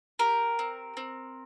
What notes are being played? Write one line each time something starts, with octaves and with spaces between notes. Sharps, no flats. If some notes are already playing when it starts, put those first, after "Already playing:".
G4 A#4
C4
C4